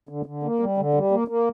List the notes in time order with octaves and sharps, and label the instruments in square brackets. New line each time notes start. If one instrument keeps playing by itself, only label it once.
[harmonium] D3
D3
A#3
G3
D3
G3
A#3
A#3